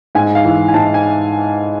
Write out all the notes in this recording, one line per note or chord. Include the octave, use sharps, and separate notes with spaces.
G#2 G#5
F5
E3
G#5
G#2 A5
G#5